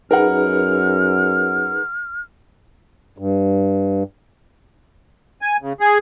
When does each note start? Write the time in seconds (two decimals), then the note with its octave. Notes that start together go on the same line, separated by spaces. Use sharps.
0.11 F#2 D#4 G#4 A#4 B4 F#5 F6
3.18 G2
5.42 G#5
5.62 C#3
5.80 G#4